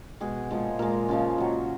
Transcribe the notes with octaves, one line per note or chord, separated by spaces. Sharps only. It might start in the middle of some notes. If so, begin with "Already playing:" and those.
B2 G#3 G#4
A#2 F3 G#3
A#2 G#3 A#4
C#3 F3 G#3 F4
A#2 F#3